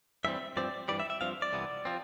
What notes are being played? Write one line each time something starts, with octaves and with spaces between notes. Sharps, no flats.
G2 E3 G3 C4 E5
G2 F3 C4 D5
G2 E3 G3 D5
E5
E5
G2 F3 C4 F5
D5
C2 C3 E3 B3
F3 C4